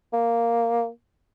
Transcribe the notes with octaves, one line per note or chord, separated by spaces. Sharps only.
A#3